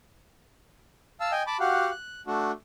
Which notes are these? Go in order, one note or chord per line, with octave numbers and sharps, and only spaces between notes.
F5 A5 E6
D#5 G5 G#5
A5 B5 D6
F#4 G4 F5 F#5
F#6
A3 D4 F#4